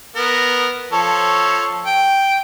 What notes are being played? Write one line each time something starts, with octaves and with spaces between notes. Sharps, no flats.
B3 A#4
F3 A4 C#5
G5